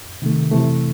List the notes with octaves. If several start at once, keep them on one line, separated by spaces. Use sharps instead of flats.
C3 D#3 A3
C3 E3 A3